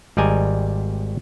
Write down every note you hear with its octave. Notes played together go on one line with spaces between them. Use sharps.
G#1 G3 D5 D#5 G#5 A#5